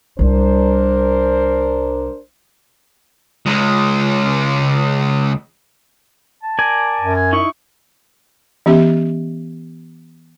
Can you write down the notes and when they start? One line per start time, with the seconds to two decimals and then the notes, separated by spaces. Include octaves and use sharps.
0.19 C2 G3 D4 A#4 C5
3.46 C#2 G#3
6.43 A5
6.59 A#4 D5 G#5
7.01 F#2
7.16 G#5
7.33 D#4 E4 C#6
8.66 E3 B3 C#4 G4 E5